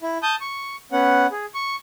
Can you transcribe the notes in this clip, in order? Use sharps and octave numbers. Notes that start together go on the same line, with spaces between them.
E4
A5 D#6 G6
C#6
B3 C#4 F#5
G#4
C#6